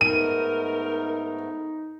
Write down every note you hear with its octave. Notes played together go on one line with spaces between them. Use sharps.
G#2 A3 B3 D#4 A#4 D#7